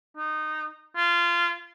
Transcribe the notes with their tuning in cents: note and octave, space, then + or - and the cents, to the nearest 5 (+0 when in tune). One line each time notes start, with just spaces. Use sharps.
D#4 -15
F4 -20